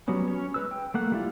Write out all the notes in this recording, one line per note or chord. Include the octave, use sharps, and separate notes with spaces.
F#3 G3 B3 C#4
C#4 C#5
G#3 B4 E6
G5
A3 A#3 F#5
G3 E4 F4